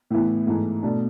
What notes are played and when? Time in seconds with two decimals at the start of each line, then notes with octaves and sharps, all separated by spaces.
0.10 A2 E3 B3 E4
0.47 G#2 E3 A3
0.83 B2 A3 D4